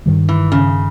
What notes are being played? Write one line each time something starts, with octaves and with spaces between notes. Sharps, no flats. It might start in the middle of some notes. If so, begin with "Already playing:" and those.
G2 D#3 G3
E3
C#3